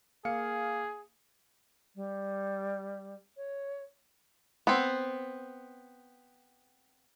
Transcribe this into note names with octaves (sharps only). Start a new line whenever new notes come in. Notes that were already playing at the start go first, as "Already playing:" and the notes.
A#3 G#4 F5 C#7
G3
C#5
B3 C4